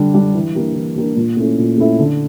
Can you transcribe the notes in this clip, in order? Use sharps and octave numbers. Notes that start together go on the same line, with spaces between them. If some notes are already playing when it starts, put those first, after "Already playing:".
Already playing: D3 G3 D4
G3 D4
E3
A#3 D4 G4 A#4
E3
A#3 D4 G4 A#4
A#2
A3 C#4 E4 A4
A#2
A3 C#4 E4 A4
D3